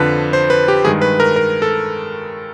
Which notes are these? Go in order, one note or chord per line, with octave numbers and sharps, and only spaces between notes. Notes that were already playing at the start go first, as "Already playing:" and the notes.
Already playing: F2 D3 F3 B4
C5
B4
G4
G2 D#3 G#3 G#4
B4
A#4
A#4
A4